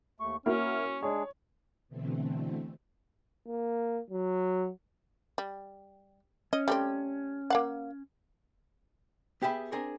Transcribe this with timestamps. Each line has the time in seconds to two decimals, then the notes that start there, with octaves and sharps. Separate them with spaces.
0.20 D#2 A3 C#6
0.46 A#3 C#4 E4 F#4 F6
1.03 G#3 D4 G#4 C#5
1.88 B2 D3 E3 A3 C4
3.47 A#3
4.10 F#3
5.38 G3
6.53 C#4 D#5
6.68 G3 A3 C4
7.50 A#3 F5 F#5
9.42 B3 G4 G#4 E5 B5
9.72 C4 D4 G#4 A#4